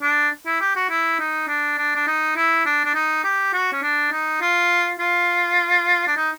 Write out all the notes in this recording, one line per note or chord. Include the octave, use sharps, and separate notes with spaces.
D4
E4
G4
F#4
E4
D#4
D4
D4
D4
D#4
E4
D4
D4
D#4
G4
F#4
C#4
D4
D#4
F4
F4
D4
D#4